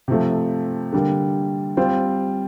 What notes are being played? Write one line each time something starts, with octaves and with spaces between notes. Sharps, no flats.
C3 F3 A3
D3 G3 A#3
G3 C4 F4